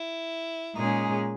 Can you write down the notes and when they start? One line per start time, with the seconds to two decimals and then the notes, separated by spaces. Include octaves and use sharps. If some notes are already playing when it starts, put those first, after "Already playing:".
Already playing: E4
0.75 A#2 G#3 C#4 D#4 G#4